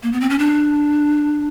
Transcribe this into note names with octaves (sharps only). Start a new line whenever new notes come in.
A#3
B3
C4
C#4
D4